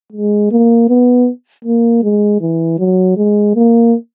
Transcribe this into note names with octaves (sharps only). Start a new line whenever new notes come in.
G#3
A#3
B3
A#3
G#3
E3
F#3
G#3
A#3